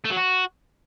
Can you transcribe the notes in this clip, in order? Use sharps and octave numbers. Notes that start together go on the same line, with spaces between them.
A3
F#3
F#4